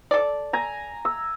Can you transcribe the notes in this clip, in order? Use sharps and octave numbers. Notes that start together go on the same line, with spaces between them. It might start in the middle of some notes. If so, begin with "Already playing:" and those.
A4 D5
G#5 A#5
E6